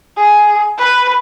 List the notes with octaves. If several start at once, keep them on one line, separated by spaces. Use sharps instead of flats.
G#4
B4